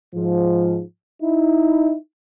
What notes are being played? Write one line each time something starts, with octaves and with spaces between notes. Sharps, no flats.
G#2 F3
D#4 E4